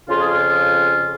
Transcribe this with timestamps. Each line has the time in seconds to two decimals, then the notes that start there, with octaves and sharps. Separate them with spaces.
0.09 F2 C#3 F4
0.17 G#4
0.26 F4